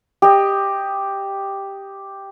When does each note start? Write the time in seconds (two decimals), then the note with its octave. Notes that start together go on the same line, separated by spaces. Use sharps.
0.22 G4 D#5